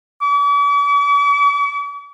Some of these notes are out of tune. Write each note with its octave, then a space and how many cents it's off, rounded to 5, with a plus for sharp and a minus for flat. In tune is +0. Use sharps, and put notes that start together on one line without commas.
D6 -45